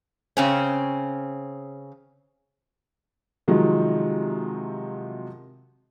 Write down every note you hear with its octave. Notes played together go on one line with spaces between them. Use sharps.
C#3 C4 C#4
C3 D#3 F3 F#3 G#3